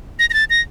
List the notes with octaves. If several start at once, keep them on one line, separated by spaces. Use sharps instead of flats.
A#6
A#6
A6
A#6